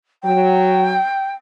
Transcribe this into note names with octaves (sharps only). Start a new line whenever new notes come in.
F#3 G5